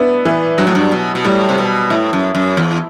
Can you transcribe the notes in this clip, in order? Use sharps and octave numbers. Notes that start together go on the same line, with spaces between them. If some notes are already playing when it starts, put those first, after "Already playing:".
Already playing: B3 D4 E4
E3
G2 F#3
A2
G2
B2
B2
A2 G3
C3
B2
A2 E4
F#2
F#2
E2